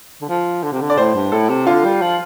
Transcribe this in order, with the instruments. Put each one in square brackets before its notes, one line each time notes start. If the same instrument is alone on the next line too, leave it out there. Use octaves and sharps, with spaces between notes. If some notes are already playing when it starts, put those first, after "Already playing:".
[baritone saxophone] D3
F3
D3
C3
D3
[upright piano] D5
[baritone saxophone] A2 [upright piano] C5
[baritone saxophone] G2
[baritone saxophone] A2 [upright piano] A4
[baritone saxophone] C3
[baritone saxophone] D3 [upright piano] F4
[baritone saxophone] G3
F3